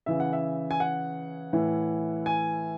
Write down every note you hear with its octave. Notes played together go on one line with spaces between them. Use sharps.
C#3 E3 E5
F#5
E5
G#5
F#5
A2 E3
G#5